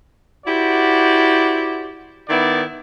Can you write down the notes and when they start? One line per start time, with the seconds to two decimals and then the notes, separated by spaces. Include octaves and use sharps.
0.46 E4 F#4 G4 C5 D5
2.29 D#3 B3 E4 D5